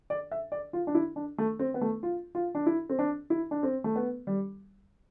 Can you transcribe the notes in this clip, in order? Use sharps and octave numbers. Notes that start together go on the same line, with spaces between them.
D5
E5
D5
F4
D4
E4
D4
A3
C4
B3
A3
F4
F4
D4
E4
C4
D4
E4
D4
C4
A3
B3
G3